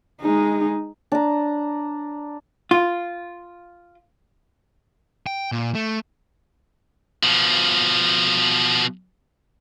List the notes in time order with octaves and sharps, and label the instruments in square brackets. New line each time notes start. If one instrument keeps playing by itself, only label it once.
[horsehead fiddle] G#3 D#4
[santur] D4 A#5
[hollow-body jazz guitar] F4
[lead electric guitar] G5
A#2
A3
[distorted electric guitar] B2 F3